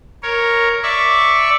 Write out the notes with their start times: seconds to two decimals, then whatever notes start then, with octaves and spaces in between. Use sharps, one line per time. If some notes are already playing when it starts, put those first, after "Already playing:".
0.23 A#4 C#5
0.83 D5 E5 C#6